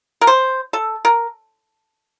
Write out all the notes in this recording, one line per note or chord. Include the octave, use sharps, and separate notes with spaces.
A#4
C5
A4
A#4